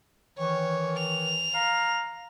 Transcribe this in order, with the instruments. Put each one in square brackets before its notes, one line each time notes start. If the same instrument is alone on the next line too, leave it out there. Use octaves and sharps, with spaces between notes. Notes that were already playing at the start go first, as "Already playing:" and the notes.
[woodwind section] D#3 E3 [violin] C#5
[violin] F7
[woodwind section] F5 A#5